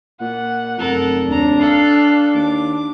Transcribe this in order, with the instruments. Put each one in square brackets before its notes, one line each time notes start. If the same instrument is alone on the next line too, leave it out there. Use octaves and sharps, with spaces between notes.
[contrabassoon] A#2 [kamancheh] F#5
[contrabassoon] F1 [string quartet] F#2 A4 A#4
[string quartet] D#2 A#5 [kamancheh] D4
[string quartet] A4 F5 F#6
[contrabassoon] D#2 [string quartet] D6